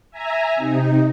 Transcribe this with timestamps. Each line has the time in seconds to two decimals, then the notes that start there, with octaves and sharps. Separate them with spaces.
0.11 E5 G#5 A#5
0.56 C3 D#4